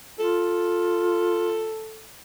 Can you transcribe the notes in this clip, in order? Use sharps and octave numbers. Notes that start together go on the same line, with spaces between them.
F4 A4